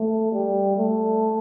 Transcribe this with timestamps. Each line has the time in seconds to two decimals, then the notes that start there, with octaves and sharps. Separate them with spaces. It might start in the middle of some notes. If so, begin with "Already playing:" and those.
Already playing: A3
0.32 G3
0.77 A3